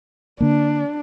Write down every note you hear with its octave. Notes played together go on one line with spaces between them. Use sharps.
D3 A#3 D4